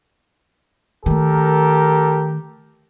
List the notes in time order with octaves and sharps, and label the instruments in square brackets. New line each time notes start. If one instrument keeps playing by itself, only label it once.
[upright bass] D#3 A3 [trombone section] G4 A4 A#4